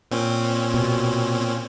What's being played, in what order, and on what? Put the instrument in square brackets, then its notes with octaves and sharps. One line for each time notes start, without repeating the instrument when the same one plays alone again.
[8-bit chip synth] A#2 C4 C#4
[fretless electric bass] B2